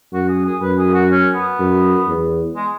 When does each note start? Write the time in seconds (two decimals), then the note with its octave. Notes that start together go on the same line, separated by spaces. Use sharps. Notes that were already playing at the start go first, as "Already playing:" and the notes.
0.13 F#2 F#4
0.29 G#4
0.45 G#4
0.62 F#2 B4
0.79 G#4
0.94 F#4
1.11 C#4
1.35 B3
1.59 F#2
2.07 E2
2.56 G#3